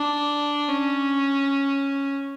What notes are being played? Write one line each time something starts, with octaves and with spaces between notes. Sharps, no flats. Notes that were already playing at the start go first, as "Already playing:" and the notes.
Already playing: D4
C#4